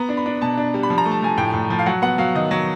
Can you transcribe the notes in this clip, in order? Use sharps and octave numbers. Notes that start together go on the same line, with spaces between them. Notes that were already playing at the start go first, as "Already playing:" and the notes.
Already playing: B3 A#5
D4
B5
D4
B2 A5
D4
G3
B5
F3
A#5
A3
A5
F3 G#5
A2 G5
A2
F3
F5
F#3 F#5
B3 F#5
F#3 F5
D#3 D#5
F#3